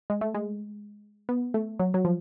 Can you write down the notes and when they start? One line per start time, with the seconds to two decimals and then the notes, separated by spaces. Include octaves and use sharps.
0.10 G#3
0.21 A3
0.35 G#3
1.29 B3
1.54 A3
1.79 F#3
1.94 F#3
2.05 F3